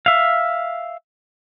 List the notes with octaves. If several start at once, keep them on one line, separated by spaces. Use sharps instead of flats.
E5 F5